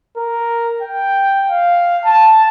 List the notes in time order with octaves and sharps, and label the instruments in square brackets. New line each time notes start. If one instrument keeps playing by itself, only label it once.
[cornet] A#4
G5
F5
A5